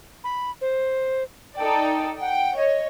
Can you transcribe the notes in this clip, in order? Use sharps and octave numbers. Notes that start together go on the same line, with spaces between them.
B5
C5
D#4 A4 D5 G5
F#5 G5
C#5 D#5